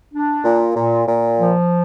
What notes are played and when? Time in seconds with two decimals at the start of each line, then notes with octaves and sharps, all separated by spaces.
0.13 D4
0.44 A#2
0.76 A#2
1.07 A#2
1.39 F3